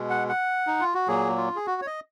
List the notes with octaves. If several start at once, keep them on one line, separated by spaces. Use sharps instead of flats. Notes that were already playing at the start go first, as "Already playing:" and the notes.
Already playing: B2 G#3
F#5
F#5
D#4
F4
F#4
A#2 F#3 A#3 G#4
F4
G#4
F#4
C#5
D#5